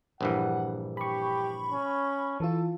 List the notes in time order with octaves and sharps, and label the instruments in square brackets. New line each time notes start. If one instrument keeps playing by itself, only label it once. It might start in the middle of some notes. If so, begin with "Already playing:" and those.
[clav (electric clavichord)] A#1 G2 E3 [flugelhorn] F#5
[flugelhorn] G4 [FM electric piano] B5 C#6
[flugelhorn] C#4
[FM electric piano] E3 F4 [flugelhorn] A4